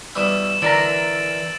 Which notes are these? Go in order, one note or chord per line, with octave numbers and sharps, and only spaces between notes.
B2 E3 G3 E6 E7
D3 E3 A#4 A#5 A6 D7 F#7